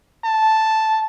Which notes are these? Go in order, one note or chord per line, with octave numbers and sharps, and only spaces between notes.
A5